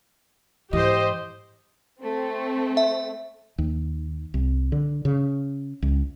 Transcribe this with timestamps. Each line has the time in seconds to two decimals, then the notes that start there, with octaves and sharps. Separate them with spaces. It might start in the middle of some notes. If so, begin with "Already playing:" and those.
0.73 G#2 E3 G4 C5 D#5
2.00 A3 C4
2.77 E5
3.58 D#2
4.34 C2
4.72 D3
5.05 C#3
5.82 C#2